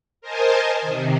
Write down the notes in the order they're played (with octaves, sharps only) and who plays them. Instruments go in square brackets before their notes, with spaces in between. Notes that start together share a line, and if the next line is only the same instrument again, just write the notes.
[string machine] A#4 C5 D#5 G#5 A5
C3 D#3